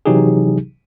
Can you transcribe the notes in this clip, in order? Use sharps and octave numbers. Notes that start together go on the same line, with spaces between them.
C3 E3 F#3 D#4 G4 G#4